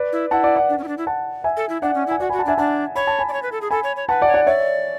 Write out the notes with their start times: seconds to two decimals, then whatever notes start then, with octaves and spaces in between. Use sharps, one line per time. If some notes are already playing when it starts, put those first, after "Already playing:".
Already playing: B4 D5
0.12 E4
0.31 E4 F#5 A5
0.43 D5 F#5
0.56 D5 F#5
0.69 D4
0.78 C#4
0.84 E4
0.88 D4
0.98 E4
1.07 F#5 A5
1.44 E5 G#5
1.57 A4
1.69 E4
1.82 D4 D5 F#5
1.95 C#4
2.07 E4
2.11 G#5
2.20 F#4 D5 F#5
2.30 G#5 B5
2.33 F#4
2.39 F#5 A5
2.45 D4 E5 G#5
2.58 D4 F#5 A5
2.95 C#5 B5
3.07 A5
3.19 G#5 B5
3.29 D5
3.33 C#5
3.43 B4
3.52 A4
3.61 G#4
3.71 A4 G#5 B5
3.84 C#5
3.96 C#5
4.09 B4 F#5 A5
4.22 D5 F#5
4.27 C#5
4.34 D5 F#5
4.46 C#5 D5 E5